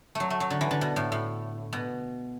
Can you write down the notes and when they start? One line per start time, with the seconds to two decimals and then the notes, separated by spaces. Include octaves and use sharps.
0.15 F#3 A3
0.30 A3
0.40 F#3
0.50 D3
0.61 E3
0.71 D3
0.81 B2
0.96 A2
1.12 A2
1.73 B2